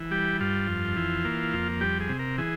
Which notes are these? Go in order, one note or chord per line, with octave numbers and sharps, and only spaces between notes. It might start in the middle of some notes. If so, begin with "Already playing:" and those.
Already playing: E3
G3 G4
G2 F4
F2
E3
A#3
F2
G3 G4
G#4
C3
A#4
E3 G#4